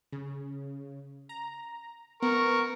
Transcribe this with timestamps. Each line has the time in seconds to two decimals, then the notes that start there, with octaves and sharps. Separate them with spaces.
0.12 C#3
1.29 A#5
2.22 B3 A#4 C#6